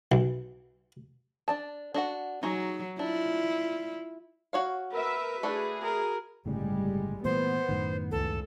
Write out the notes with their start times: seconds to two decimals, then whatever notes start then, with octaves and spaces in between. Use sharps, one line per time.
0.12 B1
1.48 D4 D5 A5
1.94 D4 F#4 F#5
2.43 F#3 D#4 F#4 G#4
2.99 D4 E4 F4
4.53 F#4 C#5 F5
4.93 A#4 B4 E5
5.43 A3 D4 E4 F#4 G#4
5.82 A#4
6.46 G1 A2 C#3 G3 G#3
7.24 A#2 E3 A3 B3 C5
7.69 F#2 A2 D#3
8.11 C#2 A4